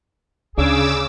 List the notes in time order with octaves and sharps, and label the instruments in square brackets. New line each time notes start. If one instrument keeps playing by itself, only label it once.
[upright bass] D2 [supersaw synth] C#3 D6 E6 [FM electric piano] C#4 D4 [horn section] G#4